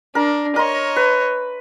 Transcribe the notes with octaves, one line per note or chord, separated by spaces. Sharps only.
D4 A#4
A#4 C#5 D#5 C6
B4